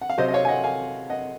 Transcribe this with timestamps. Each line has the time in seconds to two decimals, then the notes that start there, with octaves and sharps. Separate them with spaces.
0.01 F#5
0.10 F5
0.18 C3 F#3 C5 D#5
0.28 D#5
0.34 C#5 F5
0.45 G#5
0.48 D#5 F#5
0.64 F5 G#5
1.10 D#5 F#5